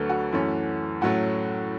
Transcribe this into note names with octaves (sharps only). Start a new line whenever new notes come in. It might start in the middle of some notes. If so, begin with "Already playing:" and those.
Already playing: D2 D3 F#3 A3 A4 B4 C#5
F#4
F#2 E3 A3 C#4
A2 F#3 A3 C#4 F#4